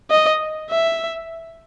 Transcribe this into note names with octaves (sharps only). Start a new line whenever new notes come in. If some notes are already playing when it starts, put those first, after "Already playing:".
D#5
E5